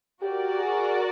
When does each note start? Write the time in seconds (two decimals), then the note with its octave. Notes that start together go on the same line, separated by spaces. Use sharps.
0.22 F#4 G4 A#4 D5
0.61 G#4